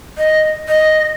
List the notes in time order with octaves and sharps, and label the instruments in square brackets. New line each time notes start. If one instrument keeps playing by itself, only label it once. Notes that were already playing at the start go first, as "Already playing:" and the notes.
[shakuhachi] D#5
D#5